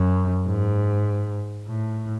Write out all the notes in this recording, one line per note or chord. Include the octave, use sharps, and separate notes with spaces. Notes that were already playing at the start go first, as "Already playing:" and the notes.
Already playing: F#2
G#2
A2